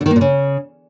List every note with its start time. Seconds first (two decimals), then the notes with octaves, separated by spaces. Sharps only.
0.01 D3
0.06 D#3
0.11 A#3
0.16 A#2
0.21 C#3